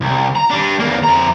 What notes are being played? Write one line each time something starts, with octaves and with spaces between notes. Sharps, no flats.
C2
A#5
G3 D4
E2 A#3
F2 A#5